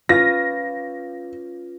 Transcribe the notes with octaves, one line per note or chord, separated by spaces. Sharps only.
C#4 F4 B4 A#6